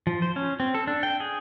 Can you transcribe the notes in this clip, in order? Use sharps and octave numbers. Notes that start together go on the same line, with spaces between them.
F3
C5
C#4
C4
A4
D4
G5
G#4